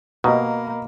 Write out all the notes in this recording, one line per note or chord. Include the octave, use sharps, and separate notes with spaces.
B2 A#3 D#5 A#5 B5